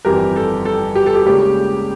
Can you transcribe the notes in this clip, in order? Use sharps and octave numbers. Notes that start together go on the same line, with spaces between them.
G1 F2 E3 G4 A#4
A4
A4
G4
A4
G4
C#2 C#3 G3 A#3 C#4 G4